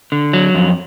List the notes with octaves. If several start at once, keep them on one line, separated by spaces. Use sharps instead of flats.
D3
F#3
F2